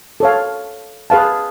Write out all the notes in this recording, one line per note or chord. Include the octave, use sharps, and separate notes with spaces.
A4 C#5 F5
G#4 B4 F5 A5